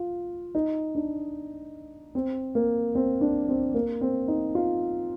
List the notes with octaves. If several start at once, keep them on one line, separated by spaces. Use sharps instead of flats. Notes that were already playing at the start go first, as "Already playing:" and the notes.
Already playing: F4
D#4
D4
C4
A#3
C4
D4
C4
A#3
C4
D#4
F4